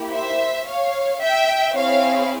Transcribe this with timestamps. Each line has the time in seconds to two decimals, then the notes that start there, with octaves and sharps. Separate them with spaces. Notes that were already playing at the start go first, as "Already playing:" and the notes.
Already playing: A#3 E4 G4
0.13 C5 E5
0.66 C#5 F5
1.21 E5 G5
1.76 C4 E4 G#4 C#5 F5